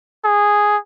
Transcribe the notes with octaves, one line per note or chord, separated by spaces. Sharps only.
G#4